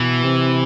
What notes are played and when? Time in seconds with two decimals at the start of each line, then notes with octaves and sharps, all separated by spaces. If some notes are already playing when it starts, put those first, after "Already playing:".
Already playing: B2 E3
0.24 C3